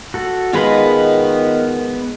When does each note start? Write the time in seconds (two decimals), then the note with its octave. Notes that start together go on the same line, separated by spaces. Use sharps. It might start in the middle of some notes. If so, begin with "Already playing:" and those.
0.14 F#4 A4
0.53 D#3 G#3 B3 F4 B4 D#5 B5